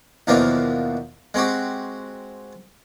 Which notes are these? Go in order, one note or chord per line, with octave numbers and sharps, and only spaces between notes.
D#2 B2 E3 F3 A#3 D4
G#3 C4 F#4 G4